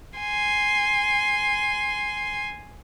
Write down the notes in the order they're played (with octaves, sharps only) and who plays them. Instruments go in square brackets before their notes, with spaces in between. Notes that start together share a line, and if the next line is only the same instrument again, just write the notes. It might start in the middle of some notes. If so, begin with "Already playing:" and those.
[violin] G#5 C6